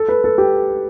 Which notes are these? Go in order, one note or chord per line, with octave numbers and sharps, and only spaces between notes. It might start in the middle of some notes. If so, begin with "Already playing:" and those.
Already playing: A4
B4
A4
G4